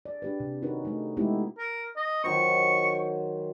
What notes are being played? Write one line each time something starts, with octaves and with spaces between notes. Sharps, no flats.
D5
D4 G4 B4
C3
C#4 D#4 F#4 A#4 B4
A3 D#4
G#3 A3 B3 D#4 E4 G4
A#4
D#5
D#3 F#3 C5 C#6